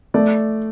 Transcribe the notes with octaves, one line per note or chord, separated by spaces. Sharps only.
A3 D5